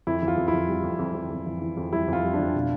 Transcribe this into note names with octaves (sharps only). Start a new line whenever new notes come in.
F2 E4
E3
F4
F2
E4
F2
G3
F2
F2
F2
F2
E3
E3
F2
G3 E4
F2 F4
G3
D4
F2
B2